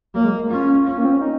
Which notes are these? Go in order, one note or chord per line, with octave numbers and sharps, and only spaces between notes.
F#3 A#3
G#3
C#4 F4
C#4
A#3
C4
C#4
D#4